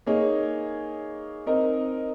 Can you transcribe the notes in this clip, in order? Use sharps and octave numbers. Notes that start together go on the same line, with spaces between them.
A#3 D#4 G#4 C#5
C4 D#4 A#4 D#5